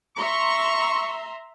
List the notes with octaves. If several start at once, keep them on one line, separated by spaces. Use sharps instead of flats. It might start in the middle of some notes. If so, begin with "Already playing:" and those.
E5 A#5 C6 C#6